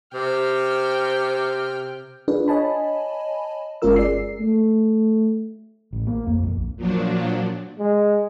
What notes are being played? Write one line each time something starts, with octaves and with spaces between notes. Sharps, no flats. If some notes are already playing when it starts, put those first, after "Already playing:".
C3 G5 F6
D4 F4 G#4 B4
C#5 D#5 G#5 A5 B5
G1 G#3 C#4 F4 A#4 E6
G#4 D5 C7
A3
A1
A#3
F2
A#1
A#2 F3 F#3 D4
G#3